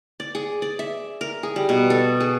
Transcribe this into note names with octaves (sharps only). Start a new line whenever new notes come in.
D5
G#4
D5
E5
A#4
G#4
G3
B2
A4
G#4